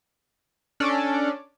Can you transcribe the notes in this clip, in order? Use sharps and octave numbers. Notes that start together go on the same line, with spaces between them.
C#4 D4 A4 D5